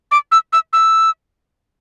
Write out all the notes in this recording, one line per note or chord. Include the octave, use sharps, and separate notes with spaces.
D6
E6
E6
E6